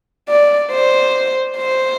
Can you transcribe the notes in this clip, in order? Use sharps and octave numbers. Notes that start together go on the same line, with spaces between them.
D5
C5
C5